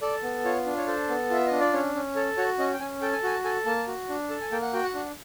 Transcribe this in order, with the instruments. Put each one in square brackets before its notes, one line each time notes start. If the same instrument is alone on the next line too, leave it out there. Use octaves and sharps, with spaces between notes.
[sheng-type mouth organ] A4 D5
B3
F4 C#5
D4
C#5
A4 C5
B3
F4 E5
D4 D#5
D5
C#4 C#5
C#4
A4 C#5
F#4 C#5
C#4 D#5
G5
C#4 G#5
A4 G5
G#5
F#4 G#5
A5
A4 G#5
A#3 A5
F#4
D4
A4 A5
G#5
A#3 G5
F#5
F#4 G5
F#5
D4